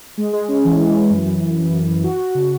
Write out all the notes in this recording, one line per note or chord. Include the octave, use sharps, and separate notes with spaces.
G#3
G#3
C#4
E3
E3
E3
F#2
F#2
F#2
E3
F#2
E3
F#4
F#4
C#3